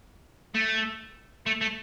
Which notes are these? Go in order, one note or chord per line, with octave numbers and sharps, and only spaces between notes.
A3
A3
A3